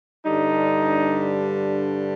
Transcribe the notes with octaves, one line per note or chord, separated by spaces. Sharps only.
G2 D3 G3 D#4